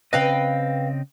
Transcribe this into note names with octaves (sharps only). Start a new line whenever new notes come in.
C#3 C4 B4 D#5 F5 G5